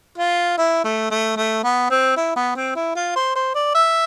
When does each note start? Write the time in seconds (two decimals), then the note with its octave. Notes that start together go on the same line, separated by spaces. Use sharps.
0.18 F4
0.58 E4
0.84 A3
1.10 A3
1.36 A3
1.63 B3
1.90 C4
2.17 E4
2.36 B3
2.56 C4
2.76 E4
2.96 F4
3.15 C5
3.35 C5
3.55 D5
3.75 E5